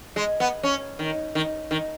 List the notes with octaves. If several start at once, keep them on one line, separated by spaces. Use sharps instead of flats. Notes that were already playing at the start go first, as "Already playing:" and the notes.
G#3
B3
C#4
D#3
D#3
D#3